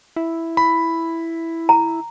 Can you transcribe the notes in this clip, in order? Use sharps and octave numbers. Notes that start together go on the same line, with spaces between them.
E4
B5
A#5